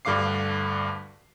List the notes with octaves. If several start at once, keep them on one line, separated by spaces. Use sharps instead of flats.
D2 G2 D3 F5 D6 C7